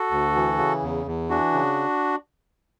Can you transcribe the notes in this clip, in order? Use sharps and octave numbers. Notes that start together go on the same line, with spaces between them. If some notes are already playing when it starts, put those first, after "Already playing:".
Already playing: F#4 A4
D2
E3
C#3
E2
E2
E3 D4 F#4
C#3